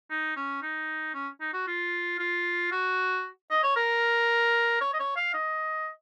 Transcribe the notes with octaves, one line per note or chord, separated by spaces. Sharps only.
D#4
C#4
D#4
C#4
D#4
F#4
F4
F4
F#4
D#5
C#5
A#4
C#5
D#5
C#5
F5
D#5